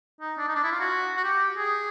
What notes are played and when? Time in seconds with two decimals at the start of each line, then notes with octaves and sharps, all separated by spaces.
0.21 D#4
0.38 D4
0.49 D#4
0.55 D4
0.64 E4
0.72 F4
0.80 F#4
1.17 F#4
1.24 G4
1.58 G#4